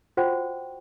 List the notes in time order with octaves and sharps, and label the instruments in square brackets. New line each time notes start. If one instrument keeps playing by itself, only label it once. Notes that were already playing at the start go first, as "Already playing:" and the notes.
[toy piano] F4 F#4 C5 F#5 G5 C#6